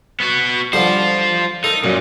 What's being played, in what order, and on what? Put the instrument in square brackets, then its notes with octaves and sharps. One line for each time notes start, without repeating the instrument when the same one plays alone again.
[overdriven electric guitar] B3 F#4
[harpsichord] D3 F3 G3 [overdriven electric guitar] F4 C5
[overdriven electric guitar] D#4 [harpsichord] A4 A#4
[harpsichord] F#2 [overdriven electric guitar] A#2